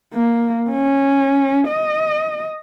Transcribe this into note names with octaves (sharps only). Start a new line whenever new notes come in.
A#3
C#4
D#5